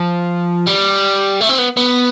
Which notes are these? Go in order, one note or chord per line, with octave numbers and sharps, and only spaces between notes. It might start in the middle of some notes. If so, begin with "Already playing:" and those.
Already playing: F3
G3
A3
C4
B3
B3